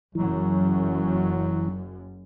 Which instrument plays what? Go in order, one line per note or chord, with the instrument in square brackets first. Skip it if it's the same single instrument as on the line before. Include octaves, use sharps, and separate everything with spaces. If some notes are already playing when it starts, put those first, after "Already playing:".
[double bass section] F#1 F#2 [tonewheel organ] E3 [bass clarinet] F#3